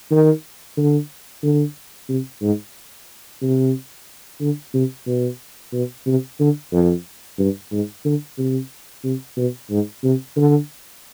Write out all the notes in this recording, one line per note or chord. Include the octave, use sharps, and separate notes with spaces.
D#3
D3
D3
C3
G#2
C3
D3
C3
B2
B2
C3
D3
F2
G2
G#2
D3
C3
C3
B2
G#2
C3
D3